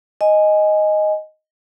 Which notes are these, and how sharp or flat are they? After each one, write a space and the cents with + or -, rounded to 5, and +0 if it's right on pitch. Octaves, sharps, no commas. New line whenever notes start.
D#5 +0 G#5 +0